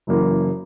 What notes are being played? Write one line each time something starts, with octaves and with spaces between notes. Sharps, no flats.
F#1 F#2 E3 A#3